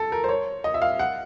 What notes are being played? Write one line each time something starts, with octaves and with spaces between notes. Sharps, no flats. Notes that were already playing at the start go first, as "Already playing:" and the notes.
Already playing: A4
A#4
C5
C#5
D#5
E5
F5
F#5